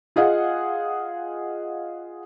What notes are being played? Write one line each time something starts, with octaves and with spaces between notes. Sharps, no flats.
F4 G#4 D#5 F5 F#5